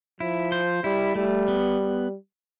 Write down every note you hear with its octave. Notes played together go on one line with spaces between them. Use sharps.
F3 E4
C5
G3 E4
G3 A3
B3